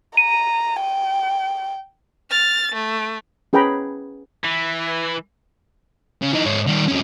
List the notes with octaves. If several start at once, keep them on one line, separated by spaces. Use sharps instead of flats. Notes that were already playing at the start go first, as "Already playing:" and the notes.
A#5 D#7
G5
F6 A6
A3
C#4 G#4 B4 G5 A#5 B5
E3
C#3
E3 D#4
G#2 C#5
D#3 G3
F2 C#4